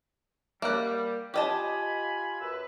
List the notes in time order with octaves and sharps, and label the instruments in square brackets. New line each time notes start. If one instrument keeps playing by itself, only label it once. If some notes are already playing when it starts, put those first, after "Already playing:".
[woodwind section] G3 [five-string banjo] A#3 F#5
[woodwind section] F4 G#5 B5 [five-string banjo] G4 D#5 A5
[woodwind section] F#2 B4 E6